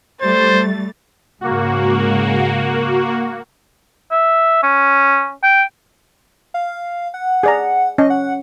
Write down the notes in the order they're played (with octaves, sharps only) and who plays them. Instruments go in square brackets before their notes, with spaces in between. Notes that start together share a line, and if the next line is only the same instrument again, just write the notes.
[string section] G3 A3 A6 [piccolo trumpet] C5
[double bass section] G#2 C#3 G#3 [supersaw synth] A#3 F#4
[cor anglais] E5
C#4
G5
[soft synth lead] F5
F#5
[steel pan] G#4 D5 A#5
[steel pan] C#4 [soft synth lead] D#5
[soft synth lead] F#5